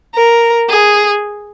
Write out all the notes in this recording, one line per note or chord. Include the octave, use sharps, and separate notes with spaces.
A#4
G#4